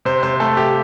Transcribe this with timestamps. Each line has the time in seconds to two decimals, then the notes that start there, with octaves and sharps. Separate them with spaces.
0.05 C3 C5
0.23 C3 C5
0.40 A3 A4
0.57 A3 G4